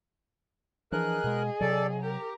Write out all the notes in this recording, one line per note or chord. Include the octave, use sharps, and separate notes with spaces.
E3 F3 D4 G#4 A#4 D#5 F#6
B2 G#3
C3 F#3 A4 D5
G4 A#4 A#5